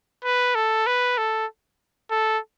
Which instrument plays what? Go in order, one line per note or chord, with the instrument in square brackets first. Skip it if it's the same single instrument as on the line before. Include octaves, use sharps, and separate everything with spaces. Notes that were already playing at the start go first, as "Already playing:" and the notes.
[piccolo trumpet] B4
A4
B4
A4
A4